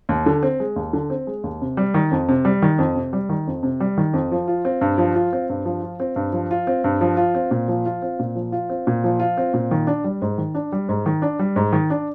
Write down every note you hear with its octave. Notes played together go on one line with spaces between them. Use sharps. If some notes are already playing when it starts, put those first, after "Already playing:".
D#2
D3
C4
G#3
D#2
D3
C4
G#3
D#2
C3
G3
D#3
F2
C3
G3
D#3
F2
C3
G3
D#3
F2
C3
G3
D#3
F2
F3
F4
C4
G2
F3
F4
C4
G2
F3
F4
C4
G2
F3
F4
C4
G2
F3
F4
C4
A#2
F3
F4
C4
A#2
F3
F4
C4
A#2
F3
F4
C4
A#2
D#3
D4
G3
G#2
D#3
D4
G3
G#2
D#3
D4
G3
G#2
D#3
D4